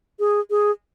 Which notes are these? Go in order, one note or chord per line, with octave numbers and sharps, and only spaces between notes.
G#4
G#4